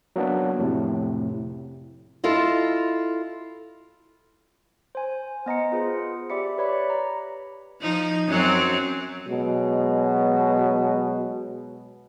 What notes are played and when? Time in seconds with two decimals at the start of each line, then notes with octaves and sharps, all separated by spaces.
0.16 F#3 A#3 B3 D4
0.59 F2 A2 C3
2.24 E4 F4 A4 D#5
4.95 C5 G#5
5.46 B3 D#5 A#5 C#7
5.72 F4 G#4 B4 C5
6.30 G4 D5 E5 B5 C#7
6.58 G4 B4 C#5 D5 B5
6.90 A#5
7.80 F3 D#4
8.27 F#2 F#3 C4
9.27 B2 F#3 G#3